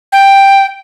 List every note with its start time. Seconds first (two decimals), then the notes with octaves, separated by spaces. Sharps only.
0.12 G5